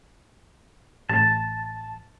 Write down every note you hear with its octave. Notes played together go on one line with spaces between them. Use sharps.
A1 A5